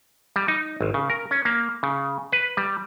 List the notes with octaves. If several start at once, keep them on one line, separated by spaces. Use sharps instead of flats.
G3
D#4
G#1
C#3
A#4
C#4
A#3
C#3
B4
G3